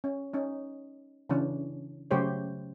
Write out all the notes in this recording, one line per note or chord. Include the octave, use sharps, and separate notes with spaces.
C#4
C#4 D#4
C#3 E3 C#4 D4
C#3 F#3 A3 G4 C5 C#5